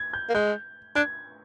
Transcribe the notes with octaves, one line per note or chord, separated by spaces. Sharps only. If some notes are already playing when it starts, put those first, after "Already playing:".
Already playing: G#6
G6
A#3
G#3 G6
D4 G#6